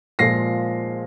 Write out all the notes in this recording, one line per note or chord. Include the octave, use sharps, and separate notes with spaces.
A#2 F3 G#3 A#6 C7